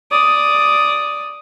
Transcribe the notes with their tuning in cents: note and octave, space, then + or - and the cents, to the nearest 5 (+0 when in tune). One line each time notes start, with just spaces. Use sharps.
D5 +0 D#6 +0